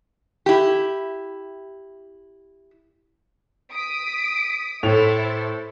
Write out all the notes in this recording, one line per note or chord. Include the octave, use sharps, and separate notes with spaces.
E4 G4
D#6 B6 D7
A2 E4 A4 C5 F7